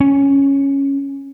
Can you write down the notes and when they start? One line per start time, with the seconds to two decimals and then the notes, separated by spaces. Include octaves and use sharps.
0.01 C#4